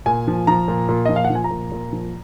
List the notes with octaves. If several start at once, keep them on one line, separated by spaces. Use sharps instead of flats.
A#2 G#5
F3
F3 A#5
A#2
A#2
F3 D#5
F5
F#5
F3
G#5
A#5
A#2
A#2
F3